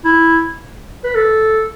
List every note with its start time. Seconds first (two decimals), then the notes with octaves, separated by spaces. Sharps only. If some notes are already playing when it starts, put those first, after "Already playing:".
0.04 E4
1.04 B4
1.14 A4